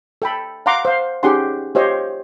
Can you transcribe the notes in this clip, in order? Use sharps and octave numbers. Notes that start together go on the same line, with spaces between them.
A4 G5 B5
F5 F#5 A#5 C6 D6
C5 F5
C#4 D#4 G4 G#4 F#5 C6
F4 G4 C5 C#5 D#5